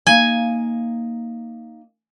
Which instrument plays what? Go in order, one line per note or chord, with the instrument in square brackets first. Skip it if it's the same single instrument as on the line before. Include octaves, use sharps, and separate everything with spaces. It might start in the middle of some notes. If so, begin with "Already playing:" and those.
[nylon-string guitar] A#3 D#4 F5 [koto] G#5